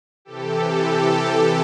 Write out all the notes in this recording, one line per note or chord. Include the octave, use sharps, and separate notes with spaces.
C3 E3 G4 A4
G4 A4